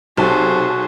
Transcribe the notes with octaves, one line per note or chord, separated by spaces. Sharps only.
B1 C3 F#4 G#4 A4 C5